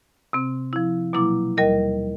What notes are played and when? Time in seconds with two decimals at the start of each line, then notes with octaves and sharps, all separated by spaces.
0.33 C3 C4
0.73 F3 E4
1.13 B2 F#3 A#3 E4 D6
1.57 D#2 G3 A#4 D#5